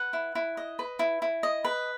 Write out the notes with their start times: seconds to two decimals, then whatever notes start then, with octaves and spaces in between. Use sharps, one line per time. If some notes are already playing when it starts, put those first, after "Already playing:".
Already playing: B4 F#5
0.13 E4
0.35 E4
0.57 D#5
0.79 B4
0.99 E4
1.22 E4
1.43 D#5
1.65 B4